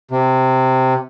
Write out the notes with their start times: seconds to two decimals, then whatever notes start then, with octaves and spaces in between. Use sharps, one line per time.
0.11 C3